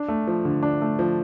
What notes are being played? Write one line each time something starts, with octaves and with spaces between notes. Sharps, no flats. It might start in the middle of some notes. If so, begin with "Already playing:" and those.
Already playing: D4
A3
F3
D3
D4
A3
F3